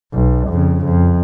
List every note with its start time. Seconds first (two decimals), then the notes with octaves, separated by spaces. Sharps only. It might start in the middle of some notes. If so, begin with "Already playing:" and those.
0.13 B1
0.49 F2 C#3
0.85 F2